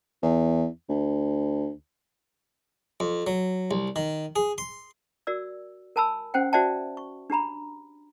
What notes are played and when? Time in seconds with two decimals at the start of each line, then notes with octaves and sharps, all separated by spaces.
0.22 E2
0.89 D2
3.00 F2
3.27 F#3
3.71 C2
3.96 D#3
4.36 G#4
4.58 C6
5.27 F#4 A#4 D5 E6
5.96 A#4 G#5 A5 B5 E6
6.34 C#4 C5 F#5 G5
6.53 F#4 C5 D5 E5 G5 A5
6.97 C#6
7.30 D4 G4 A#5 B5